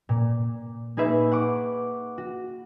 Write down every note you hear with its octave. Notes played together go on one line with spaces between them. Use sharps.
A#2
A#3 D#4 G#4 B4 E5
F#5 C#6 D6
F#4